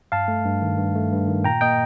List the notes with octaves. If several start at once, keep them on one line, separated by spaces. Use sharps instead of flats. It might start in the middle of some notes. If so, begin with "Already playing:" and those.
G2 F5 A5
A3
G2
D#3
G2
A3
G2
D#3
A#2 G5 A#5
A#3 D#5 G5